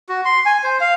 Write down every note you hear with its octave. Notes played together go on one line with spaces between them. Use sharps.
F#4
C6
G#5
C5
F5